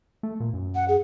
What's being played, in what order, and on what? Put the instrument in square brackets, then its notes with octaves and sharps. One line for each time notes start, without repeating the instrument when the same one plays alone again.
[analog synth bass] A3
A#2
F#2
[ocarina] F#5
G#4